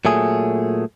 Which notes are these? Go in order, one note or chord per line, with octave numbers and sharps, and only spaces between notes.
A#2 F#3 A3 G#4